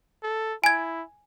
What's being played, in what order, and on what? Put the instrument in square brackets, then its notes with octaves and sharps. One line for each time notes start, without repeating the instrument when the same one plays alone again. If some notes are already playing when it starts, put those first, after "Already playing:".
[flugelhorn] A4
[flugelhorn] E4 [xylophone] G#5 G#6